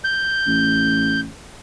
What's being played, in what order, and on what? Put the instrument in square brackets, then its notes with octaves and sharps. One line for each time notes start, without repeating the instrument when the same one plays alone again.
[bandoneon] G6
[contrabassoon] A1